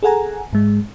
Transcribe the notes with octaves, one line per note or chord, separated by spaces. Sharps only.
G#4 A4 F#5 G#5 A#5
G#2 G#3